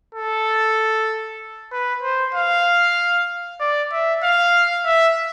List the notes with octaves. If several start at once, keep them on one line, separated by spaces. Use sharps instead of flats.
A4
B4
C5
F5
D5
E5
F5
E5